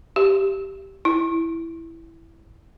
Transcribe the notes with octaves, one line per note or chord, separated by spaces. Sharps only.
G4
E4